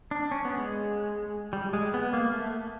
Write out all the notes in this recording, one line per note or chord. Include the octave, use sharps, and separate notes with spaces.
D4
C#4
B3
G#3
G3
G#3
B3
A#3
A3